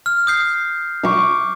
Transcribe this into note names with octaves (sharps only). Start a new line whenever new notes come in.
F6
D#6 G6 C7
C#6 D6